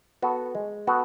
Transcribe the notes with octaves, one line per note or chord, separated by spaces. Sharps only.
B3 F#4 A4
G#3
B3 F#4 A4